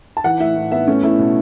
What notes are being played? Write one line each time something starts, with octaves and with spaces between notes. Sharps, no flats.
A5
E3 F#5
A2 E5
A2
B3 E5
A3 C#4
A3 E4
B2